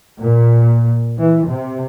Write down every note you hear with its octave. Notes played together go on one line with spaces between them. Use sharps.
A#2
E3
C3